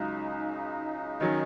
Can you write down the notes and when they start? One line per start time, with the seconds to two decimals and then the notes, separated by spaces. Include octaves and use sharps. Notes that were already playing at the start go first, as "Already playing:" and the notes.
Already playing: C#2 C#3 F#3 D#4
1.20 D#3 F#3 C#4 D#4